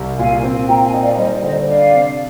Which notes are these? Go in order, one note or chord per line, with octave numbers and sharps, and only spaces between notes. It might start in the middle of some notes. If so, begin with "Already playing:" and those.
Already playing: C2
A#2 F5 G#5
C4
A#2 G5 A#5
F5 G#5
D#4
D5 F5
G3 C5 D#5
D3 C5 D#5
D4 D5 F5
C3